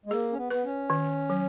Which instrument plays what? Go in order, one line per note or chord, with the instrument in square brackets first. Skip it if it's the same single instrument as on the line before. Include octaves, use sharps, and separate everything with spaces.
[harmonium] G#3
[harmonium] A#3 [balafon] G#4
[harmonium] C#4
B3
[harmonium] B3 [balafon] B4
[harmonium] C#4
[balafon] D#3
F#3